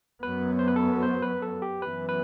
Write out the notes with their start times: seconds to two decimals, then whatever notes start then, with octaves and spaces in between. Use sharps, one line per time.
0.23 F#2 F#3 B3 B4
0.59 C5
0.68 B4
0.76 A4
1.03 C5
1.22 B4
1.42 A4
1.62 G4
1.82 F#2 E3 B3 B4
2.09 B4